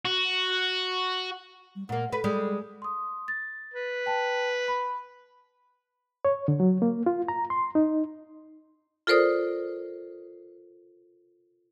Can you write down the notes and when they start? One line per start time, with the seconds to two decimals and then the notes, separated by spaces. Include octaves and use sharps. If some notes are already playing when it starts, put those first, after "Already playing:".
0.05 F#4
1.76 G3
1.89 A#2 A#3 F#5
2.12 A4 B4
2.24 G3 G#3
2.82 C6 D#6
3.28 A6
3.74 B4
4.06 G5 A5
4.68 B5
6.25 C#5
6.48 D3
6.60 F#3
6.82 A#3
7.06 F4
7.28 A#5
7.50 C6
7.75 D#4
9.07 F4 A4 A#4 C5 D5 D#6